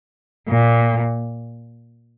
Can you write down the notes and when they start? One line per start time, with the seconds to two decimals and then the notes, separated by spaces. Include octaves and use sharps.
0.49 A#2